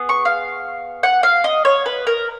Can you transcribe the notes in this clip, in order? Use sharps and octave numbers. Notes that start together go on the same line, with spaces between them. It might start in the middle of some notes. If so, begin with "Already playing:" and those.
Already playing: B3 G#4
C#6
F5
F#5
F5
D#5
C#5
B4
A#4